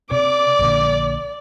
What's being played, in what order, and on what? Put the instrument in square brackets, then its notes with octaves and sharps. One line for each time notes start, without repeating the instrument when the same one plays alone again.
[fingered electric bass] C3 [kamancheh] D5 [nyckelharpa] D6
[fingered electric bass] A#1 A#2 D3